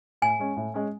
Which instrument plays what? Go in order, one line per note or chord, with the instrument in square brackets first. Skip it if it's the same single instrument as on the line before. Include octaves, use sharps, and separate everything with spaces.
[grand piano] A2 [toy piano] G#5
[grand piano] G#3 C#4
A2
G#3 C#4